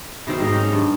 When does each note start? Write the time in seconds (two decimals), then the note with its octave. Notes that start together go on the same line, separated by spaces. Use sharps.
0.27 B2 D#3 C4
0.40 G#2 A#3 D#4
0.54 C#4
0.72 G2